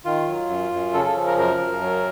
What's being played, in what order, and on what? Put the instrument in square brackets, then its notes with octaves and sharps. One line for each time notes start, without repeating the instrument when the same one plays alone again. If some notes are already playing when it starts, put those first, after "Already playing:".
[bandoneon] D#3 F4
F#3
F#2
F#2
C#3 A4
A4
F3
A#4
F#2 A#4
F#2
F#3